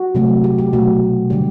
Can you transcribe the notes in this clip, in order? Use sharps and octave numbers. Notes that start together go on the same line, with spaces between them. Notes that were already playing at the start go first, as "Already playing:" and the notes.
Already playing: F#4
C3 F#3 A3
G4
G4
B2 F#3 A3 F#4
D3 G3 G4